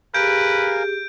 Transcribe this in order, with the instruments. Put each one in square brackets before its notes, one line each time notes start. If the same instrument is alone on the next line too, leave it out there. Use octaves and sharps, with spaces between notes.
[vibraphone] G4 G#4 [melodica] A#4 F5 G#5 [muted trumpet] B4 [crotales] G6 D7